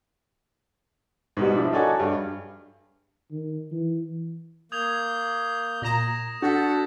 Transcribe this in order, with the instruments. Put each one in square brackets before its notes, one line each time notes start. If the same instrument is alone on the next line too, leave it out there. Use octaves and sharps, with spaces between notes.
[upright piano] G#2 B2 G3
F3 D4 E4
D#4 F#4 A4 C#5 D5 G#5
G2
[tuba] D#3
E3
[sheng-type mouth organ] A#3 G6 [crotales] D#6 G#6 F7
[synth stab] A#2 A#5 [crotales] D#6 A#6 E7
[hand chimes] D4 [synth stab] F#4 [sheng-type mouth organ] A4 F#5 [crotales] G6 A6 B6